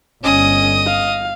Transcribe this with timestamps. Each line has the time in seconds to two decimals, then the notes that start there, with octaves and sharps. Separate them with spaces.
0.24 G1 C#4 D#5 D#6
0.87 F5